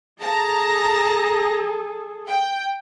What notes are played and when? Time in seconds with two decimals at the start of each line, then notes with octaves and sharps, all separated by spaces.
0.22 G#4 A4 A5 A#5 A#6
2.29 G5